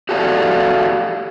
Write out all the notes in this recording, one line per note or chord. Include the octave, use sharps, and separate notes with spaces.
F#4 G4 A4 C5 D5 F5